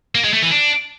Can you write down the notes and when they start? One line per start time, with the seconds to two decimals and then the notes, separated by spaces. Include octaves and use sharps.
0.15 A#3
0.24 G#3
0.33 A3
0.42 E3
0.52 D4